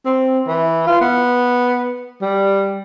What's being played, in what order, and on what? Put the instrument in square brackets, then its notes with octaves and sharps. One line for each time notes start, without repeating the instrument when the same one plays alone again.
[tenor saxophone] C4
E3
F4
B3
G3